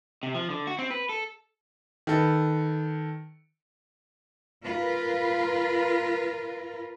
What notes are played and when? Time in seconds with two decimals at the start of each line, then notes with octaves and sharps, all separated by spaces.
0.23 C3
0.35 F3
0.50 D3
0.67 F#4
0.79 C4
0.91 B4
1.09 A4
2.07 D#3 A4 B4
4.63 F4 A#4 B4